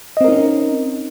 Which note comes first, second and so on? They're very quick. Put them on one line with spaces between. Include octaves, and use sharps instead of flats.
D#5 C4 A#4 D#4 C#4